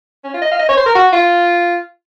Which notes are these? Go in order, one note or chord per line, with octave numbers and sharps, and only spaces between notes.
C#4
F4
D#5
F5
D#5
C#5
C5
A#4
F#4
F4